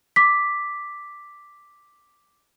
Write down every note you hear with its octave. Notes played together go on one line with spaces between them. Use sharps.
D6 B6